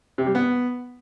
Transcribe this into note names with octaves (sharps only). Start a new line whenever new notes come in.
C3
G3
B3